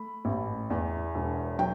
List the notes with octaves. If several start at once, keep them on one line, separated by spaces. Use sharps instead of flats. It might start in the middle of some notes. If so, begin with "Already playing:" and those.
Already playing: A3 B5
A1
E2
E1
F#3 G5